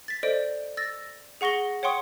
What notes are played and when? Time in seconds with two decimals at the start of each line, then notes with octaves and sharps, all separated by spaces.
0.08 A6 B6
0.23 A4 C5 D5 D#5 D7
0.77 E6 A6 A#6
1.41 G#4 F#5 C#6 A#6 G7
1.83 C#5 F#5 G5 C6 C#6 D#6